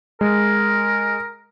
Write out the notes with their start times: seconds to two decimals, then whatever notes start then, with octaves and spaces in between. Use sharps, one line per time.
0.21 G#3 A#4